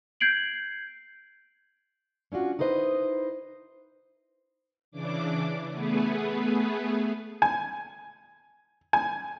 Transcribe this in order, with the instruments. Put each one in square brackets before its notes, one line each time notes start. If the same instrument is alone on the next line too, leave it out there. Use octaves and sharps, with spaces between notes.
[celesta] G6 G#6 C7 D7 F#7
[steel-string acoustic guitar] C#4 D4 F4 F#4
D#4 E4 B4 C5 D#5
[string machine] C#3 E3 D4 D6
A3 B3 G#4 B4
[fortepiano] G#5
G#5